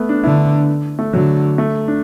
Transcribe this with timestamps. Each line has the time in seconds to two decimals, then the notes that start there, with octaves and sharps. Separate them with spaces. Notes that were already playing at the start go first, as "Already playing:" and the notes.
Already playing: A3 B3
0.09 D4
0.24 D3 E4
0.99 A3
1.13 D3 F#3
1.58 A3
1.88 D4